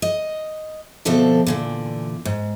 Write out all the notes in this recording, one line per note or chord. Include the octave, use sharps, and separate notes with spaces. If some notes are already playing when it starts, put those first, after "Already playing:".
D#5
B2 D3 F3 C4 A4 E5
A#2 D3 E3
G#2